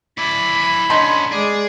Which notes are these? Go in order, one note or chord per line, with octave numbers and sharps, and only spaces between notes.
E4 D5 B5
D3 B3 C#4 D#4 C6
G#3 G#4 D5